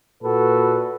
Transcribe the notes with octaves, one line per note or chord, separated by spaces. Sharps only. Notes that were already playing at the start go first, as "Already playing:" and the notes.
A#2 F#4 A4 B4